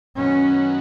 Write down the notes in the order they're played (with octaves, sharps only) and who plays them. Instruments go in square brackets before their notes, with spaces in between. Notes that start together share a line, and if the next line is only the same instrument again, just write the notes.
[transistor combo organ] F#2 D#3 F#3 B3 [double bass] C#4